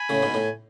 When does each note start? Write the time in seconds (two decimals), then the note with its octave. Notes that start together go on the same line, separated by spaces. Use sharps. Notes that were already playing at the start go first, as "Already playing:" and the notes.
Already playing: G#5 B5
0.09 A2 C#3
0.22 G#2 B2
0.34 A2